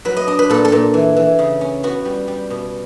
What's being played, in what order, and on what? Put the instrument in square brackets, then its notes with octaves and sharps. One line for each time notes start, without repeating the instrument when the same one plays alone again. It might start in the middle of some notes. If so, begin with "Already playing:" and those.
[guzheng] F#3 B4
D#5
D4 D#5
B4
A#2 A4
A4
A#2
E3
E3
C#3
C#4
B3 F#4
G3
G3
B2